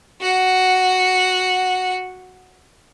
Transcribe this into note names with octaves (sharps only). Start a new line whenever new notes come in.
F#4 F#5